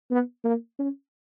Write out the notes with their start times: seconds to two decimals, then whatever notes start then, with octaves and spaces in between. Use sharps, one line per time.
0.11 B3
0.44 A#3
0.79 C#4